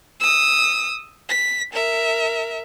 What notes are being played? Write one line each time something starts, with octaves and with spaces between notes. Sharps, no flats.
D#6 E6
B6
A#4 E5